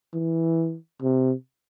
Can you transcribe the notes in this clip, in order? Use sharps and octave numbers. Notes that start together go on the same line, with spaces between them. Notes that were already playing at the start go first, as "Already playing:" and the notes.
E3
C3